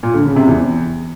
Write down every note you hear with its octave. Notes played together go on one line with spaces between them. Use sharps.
A#2
D3
C#3
C3
E2